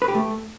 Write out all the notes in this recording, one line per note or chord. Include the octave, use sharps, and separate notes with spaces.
B4
G4
A3